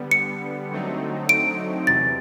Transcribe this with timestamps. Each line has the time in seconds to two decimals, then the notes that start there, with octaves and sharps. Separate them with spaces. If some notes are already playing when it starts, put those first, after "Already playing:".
Already playing: D3 G3 B3
0.11 C#7
0.70 D3 F#3 A3 C4 D#4
1.29 D7
1.87 E2 C3 E3 A6